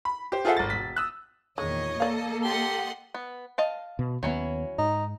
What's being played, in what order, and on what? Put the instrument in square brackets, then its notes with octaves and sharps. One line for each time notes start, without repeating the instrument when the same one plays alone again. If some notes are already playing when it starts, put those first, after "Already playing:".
[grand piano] B5
G4 C5
F4 G#4 A4 C5 E5 F#5
G#1 A6
E1 B6
D#6 E6 F#6
[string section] E2 A#2 D#3 [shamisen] G#3 [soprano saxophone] C#5 [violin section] D#5
[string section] A#3 A4 [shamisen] D5 F5
[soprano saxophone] G4 [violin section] D#5 F#5 C6
[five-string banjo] B3
D#5 F5 A5
[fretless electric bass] B2
[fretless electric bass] D#2 B3 [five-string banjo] F#3 C#4 E4
[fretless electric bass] G#2 [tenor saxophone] D#4